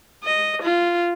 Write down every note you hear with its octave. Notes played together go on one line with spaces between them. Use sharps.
D#5
F4